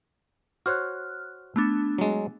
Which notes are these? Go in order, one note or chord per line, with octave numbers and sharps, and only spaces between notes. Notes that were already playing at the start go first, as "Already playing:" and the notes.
F#4 C5 C#5 F6 F#6
A3 B3 D4
F#3 G#3